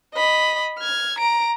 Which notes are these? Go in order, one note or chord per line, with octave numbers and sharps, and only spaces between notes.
D#5 B5
F6 G#6
A#5 D7